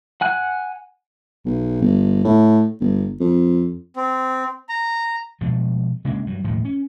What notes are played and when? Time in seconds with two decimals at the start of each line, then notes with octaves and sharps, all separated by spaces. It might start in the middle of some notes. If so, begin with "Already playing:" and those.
0.21 F#5 G#5 F#6
1.45 B1
1.82 G1
2.24 A2
2.80 G1
3.20 F2
3.96 C4
4.69 A#5
5.41 B2 F3 G#3
6.05 C#3 G#3 A#3 D4
6.26 G2 F#3
6.44 D#1 A2 D#3 F3
6.65 C#4